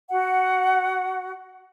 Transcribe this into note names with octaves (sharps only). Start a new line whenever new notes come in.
F#4 F#5